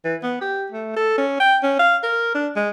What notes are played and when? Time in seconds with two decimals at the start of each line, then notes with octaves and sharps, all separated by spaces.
0.05 E3
0.23 B3
0.41 G4
0.72 A3
0.96 A4
1.18 C#4
1.40 G5
1.63 C#4
1.79 F5
2.03 A#4
2.34 D4
2.56 G#3